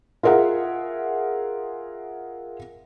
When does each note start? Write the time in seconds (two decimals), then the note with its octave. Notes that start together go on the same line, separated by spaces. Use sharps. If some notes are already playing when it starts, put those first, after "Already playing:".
0.23 F4 G#4 A#4 E5 F#5